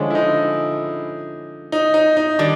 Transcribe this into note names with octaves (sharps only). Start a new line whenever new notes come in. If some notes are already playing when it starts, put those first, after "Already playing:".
Already playing: D3 F3 G#3 C#4 D4
E4
D#4
D#4
D#4
D#4
D#3 G3 D4